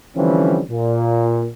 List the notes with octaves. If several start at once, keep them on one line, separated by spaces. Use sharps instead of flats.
D3 E3 F3 G3 C4 C#4
A#2